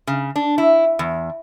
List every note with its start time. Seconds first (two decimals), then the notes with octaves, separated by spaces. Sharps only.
0.07 C#3
0.36 D4
0.58 E4
0.99 E2